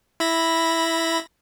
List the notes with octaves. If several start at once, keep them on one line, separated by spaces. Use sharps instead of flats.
E4 B5 A#6